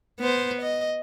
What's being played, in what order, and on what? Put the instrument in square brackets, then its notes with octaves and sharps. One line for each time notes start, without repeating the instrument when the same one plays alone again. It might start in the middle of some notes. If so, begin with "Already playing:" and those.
[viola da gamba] B3 C5
D#5